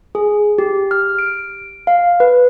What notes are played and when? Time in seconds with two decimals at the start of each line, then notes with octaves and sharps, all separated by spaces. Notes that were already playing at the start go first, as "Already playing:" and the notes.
0.15 G#4
0.58 G4
0.91 F6
1.19 D7
1.87 F5
2.20 B4